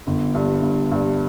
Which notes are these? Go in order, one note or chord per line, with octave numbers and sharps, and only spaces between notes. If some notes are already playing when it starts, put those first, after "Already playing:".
G1
G2
G2
G2